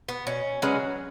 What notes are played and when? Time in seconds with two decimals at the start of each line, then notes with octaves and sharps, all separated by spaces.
0.08 B3
0.27 B2 C#4
0.62 F#3 G#3 C#4 G#4 B4